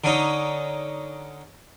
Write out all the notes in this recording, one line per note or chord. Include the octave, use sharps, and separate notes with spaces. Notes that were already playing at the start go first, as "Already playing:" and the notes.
D3 C#4 D#4